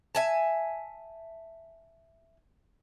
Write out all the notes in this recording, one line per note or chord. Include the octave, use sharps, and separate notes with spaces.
E5 G#5 A5